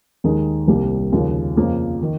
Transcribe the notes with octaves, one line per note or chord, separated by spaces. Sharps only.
D#2 D#3 G#3 D#4
C2 C3 G3 A#3
D#2 C#3 F3
F2 C#3 F3 A#3
D#3